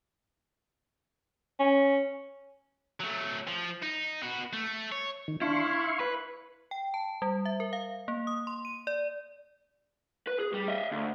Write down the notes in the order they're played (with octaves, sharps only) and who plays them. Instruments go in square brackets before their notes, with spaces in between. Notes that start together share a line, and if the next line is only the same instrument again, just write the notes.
[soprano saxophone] C#4
[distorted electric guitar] F#3 A3
F3
D#4
B3 F#4
A3
C#5
[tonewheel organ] D#3
[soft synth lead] D4 [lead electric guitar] E4 [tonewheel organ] F5 C6 C#6
[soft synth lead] G#6
[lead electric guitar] B4
[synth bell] G5
A5
G3
E5
A#4
F5
A#3
D#6
C6
D#7
D5
[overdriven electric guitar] B4
G#4
G3
D#5 E5
D2